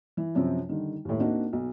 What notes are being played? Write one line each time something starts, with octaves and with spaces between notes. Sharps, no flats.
E3
F#2 C3 F3 C4
D3 D#3 G3
D#2 A2
A#3 C4 D4 D#4 F#4
B1